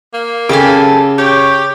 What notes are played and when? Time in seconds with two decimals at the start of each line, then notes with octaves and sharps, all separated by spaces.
0.14 A#3
0.49 C#3 G4 A4 G#5
1.18 G4 C#5